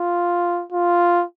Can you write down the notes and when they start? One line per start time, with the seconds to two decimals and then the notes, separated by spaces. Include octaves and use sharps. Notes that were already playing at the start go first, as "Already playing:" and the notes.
Already playing: F4
0.72 F4